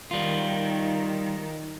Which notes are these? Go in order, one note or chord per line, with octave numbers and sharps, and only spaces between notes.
D#3 G3 F4